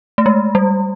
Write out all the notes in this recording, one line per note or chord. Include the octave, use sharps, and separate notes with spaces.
A3
G#3
G3